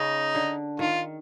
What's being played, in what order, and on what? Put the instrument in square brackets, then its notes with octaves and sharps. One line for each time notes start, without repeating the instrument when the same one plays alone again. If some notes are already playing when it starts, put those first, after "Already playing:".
Already playing: [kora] C#3 [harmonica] D#4
[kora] D3
[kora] D#3 [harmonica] F4